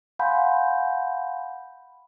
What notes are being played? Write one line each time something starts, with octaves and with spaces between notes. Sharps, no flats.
F5 F#5 G#5 B5 C6 G6